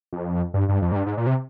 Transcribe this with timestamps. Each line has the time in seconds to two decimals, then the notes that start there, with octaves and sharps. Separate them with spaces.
0.13 F2
0.54 G2
0.69 G2
0.82 F2
0.92 G#2
0.95 G2
1.06 G#2
1.17 A#2
1.27 C3